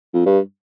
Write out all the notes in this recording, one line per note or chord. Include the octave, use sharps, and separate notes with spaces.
F2
G2